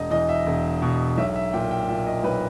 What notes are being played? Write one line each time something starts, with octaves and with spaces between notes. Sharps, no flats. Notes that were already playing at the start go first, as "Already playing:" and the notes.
Already playing: E1 D#5
E2 D#5
E5
E1
B2
B1 E5
E5
A#2 G5
G5
A#2 E5
D#5
B1 B4